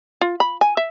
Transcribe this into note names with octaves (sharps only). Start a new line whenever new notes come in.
F4
B5
G#5
E5